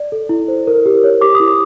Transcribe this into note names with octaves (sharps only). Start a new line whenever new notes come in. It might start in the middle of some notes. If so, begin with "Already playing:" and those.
Already playing: D5
A4
E4
C5
A#4
G4
C#5
G4 D6
D#6
E4
D6